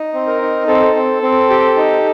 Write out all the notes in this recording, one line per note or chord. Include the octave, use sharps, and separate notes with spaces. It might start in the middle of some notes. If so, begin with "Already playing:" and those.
Already playing: D#4
C4
A#4
D#4
C4 A4
C4
C4
G4
D#4